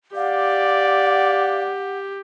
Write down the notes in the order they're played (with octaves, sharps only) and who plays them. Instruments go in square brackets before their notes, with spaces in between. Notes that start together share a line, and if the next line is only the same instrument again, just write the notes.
[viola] G4 [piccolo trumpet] D5 [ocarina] F5 [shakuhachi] F#5